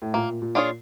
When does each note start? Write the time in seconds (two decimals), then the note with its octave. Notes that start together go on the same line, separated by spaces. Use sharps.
0.02 A2
0.14 A#2 A#3
0.42 A#2
0.55 D4 F4 G#4 C#5